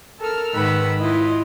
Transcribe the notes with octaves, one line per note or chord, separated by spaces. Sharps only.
A4 A#4 E6 F6
G#2 D#3 B4 F#5 B5 E6
E4 F4 D#5